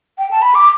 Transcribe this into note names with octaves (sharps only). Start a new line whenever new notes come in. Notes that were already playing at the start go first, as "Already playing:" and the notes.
G5
A5
B5
D6